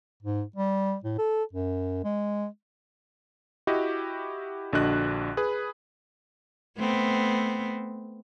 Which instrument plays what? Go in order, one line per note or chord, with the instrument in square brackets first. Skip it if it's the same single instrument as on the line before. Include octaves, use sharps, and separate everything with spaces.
[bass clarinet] G#2
G3
A2
A4
F#2
G#3
[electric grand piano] E4 F#4 G4 D#5
A#1 D3 D4 F#4 D#5 F#6
G#4 B4 B5
[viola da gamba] A3 B3 C4